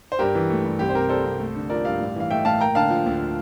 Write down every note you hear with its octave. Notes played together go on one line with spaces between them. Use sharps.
C5
G2 G4 A#4
E3
A3
G2
C2 G4
C5
C3 G4 A#4
G3 A4 C5
C2
A3
D3
F3 A#4 D5
G2 D5 F5
A2
E3 F5
A3 E5 G5
A2 F5 A5
A#3 G5 A#5
D3 F5 A5
F3
D2